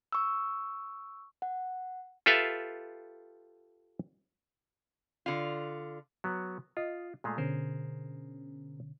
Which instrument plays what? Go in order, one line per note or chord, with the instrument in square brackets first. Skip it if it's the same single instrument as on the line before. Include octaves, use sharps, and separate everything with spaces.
[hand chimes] C#6 E6
F#5
[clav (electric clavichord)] F4 G4 A4 B4 E5 F5
[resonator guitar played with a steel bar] D3 F4
[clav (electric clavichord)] F#3 B3
[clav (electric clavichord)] F4 [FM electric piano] D#5
[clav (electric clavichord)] A#2 G#3 A3 [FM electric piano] G#4 C6
[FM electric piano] B2 D3 C#4 [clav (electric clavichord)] G#4 A#4 C5